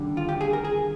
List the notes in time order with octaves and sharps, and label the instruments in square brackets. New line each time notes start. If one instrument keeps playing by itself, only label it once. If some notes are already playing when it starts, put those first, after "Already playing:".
Already playing: [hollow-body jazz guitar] D#2 D3 G3 D4
F4
G4
G#4
A#4
G#4